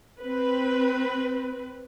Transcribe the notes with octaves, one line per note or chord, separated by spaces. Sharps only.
C4 B4